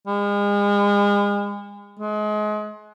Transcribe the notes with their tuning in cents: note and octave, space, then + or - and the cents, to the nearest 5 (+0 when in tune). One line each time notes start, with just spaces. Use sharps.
G#3 -40
G#3 +30